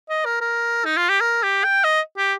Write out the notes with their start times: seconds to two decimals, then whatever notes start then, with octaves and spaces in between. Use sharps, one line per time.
0.10 D#5
0.25 A#4
0.41 A#4
0.85 D#4
0.97 F4
1.09 G4
1.21 A#4
1.43 G4
1.64 G5
1.84 D#5
2.17 G4